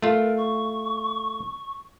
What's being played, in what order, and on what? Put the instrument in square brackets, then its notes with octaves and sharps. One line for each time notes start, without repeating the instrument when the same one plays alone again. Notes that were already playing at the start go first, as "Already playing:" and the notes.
[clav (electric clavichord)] A3 F4 [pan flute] A#4
[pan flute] C#6